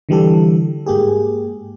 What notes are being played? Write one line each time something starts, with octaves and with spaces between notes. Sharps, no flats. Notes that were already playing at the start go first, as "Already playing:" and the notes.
D3 E3 G3 G4 A4
G#2 A#3 G4 G#4